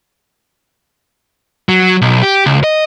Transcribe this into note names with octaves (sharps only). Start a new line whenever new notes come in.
F#3
B1
G4
C#2
D#5